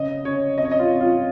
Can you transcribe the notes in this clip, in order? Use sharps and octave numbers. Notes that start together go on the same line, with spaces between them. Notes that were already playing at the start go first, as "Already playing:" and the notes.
Already playing: C#3 D#5
C#3 C#5
F2 D#5
C#5
D#5
F4
F2
F4